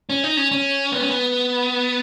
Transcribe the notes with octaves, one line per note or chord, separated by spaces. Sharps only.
C#4
D#4
C#4
C#4
B3
C#4
B3